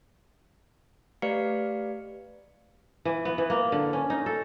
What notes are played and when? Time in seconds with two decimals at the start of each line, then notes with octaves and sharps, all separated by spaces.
1.22 A3 G4 B4 D5 F5 C#7
3.05 E3
3.25 B3
3.38 E3
3.50 A#3
3.72 D3
3.93 C#4
4.10 D#4
4.26 A4